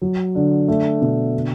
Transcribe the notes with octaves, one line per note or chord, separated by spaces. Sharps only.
F#3
D3
A3
B2
D3